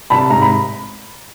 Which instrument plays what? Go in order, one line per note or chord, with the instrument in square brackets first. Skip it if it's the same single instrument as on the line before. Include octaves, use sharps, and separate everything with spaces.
[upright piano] C2 A5 B5
G#2 A#5
B5